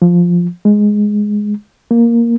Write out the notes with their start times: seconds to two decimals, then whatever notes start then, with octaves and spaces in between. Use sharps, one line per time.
0.02 F3
0.65 G#3
1.91 A#3